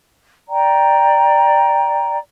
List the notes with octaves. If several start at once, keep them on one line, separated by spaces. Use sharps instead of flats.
D5 G5 A#5